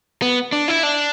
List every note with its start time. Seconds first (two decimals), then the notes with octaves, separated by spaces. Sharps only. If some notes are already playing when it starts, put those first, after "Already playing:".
0.22 B3
0.52 D4
0.68 E4
0.83 D4